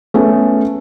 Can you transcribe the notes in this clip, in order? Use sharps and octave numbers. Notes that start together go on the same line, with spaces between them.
A3 B3 C#4